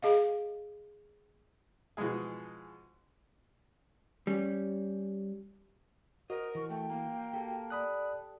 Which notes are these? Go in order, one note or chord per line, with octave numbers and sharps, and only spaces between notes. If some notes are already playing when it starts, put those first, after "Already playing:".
G#4 D#5 F5
B2 E3 F3 G#3 G#4
G3 C#4
F#4 A#4 C5 D#5
E3 C#6
A3 G5
A#3
G4 A4
D5 B5 D#6 F#6